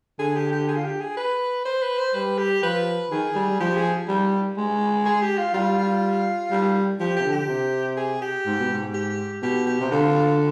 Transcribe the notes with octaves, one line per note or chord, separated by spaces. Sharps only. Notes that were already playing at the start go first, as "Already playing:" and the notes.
D3 G#4
G4
G4
G#4
F4
G4
G#4
B4
C5
B4
C5
G3 B4
G4
F3 B4
D#3 G#4
G3
G3
F3 G4
G#4
G3
G#3
G#4
G4
F4
G3 F4
F4
G3
F3 G4
C3 G4
D3
G4
C3
G#4
G4
G#2
B2
G#2
G4
B2 G4
G4
C3
D3 F4